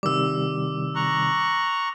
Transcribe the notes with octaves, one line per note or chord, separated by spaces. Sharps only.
C3 D#3 G3 D6 E6
A#5 C#6 F#6